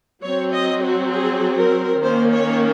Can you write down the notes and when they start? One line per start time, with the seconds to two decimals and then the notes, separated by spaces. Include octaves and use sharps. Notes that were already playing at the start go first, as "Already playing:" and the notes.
0.23 F#3 C4 C#5
0.53 D#5
0.82 F#4
1.12 G#4
1.57 A#4
2.02 D#3 A#3 C#4 C5
2.32 C#5